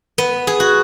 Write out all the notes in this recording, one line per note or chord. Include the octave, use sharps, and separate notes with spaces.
B3
G#4
F#4